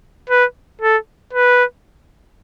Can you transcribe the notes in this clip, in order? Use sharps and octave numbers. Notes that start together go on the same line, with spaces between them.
B4
A4
B4